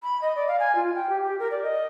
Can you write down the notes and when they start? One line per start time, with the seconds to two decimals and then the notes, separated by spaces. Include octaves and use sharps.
0.03 B5
0.22 D#5
0.36 D5
0.48 F5
0.60 G#5
0.75 F4
0.95 G5
1.09 G4
1.23 G4
1.39 A#4
1.51 D5
1.63 D#5